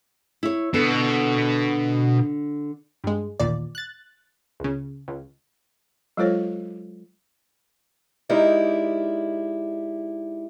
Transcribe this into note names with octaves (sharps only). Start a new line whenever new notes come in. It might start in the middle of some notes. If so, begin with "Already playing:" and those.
E4 C#5
B2 D3
G2 G#3
A1 D#2 A#2 D5
F#6 A6
C#2 C#3
C#2
F#3 G#3 F4 A4 C5 C#5
G#3 D#4 E4 G4 A#4 D5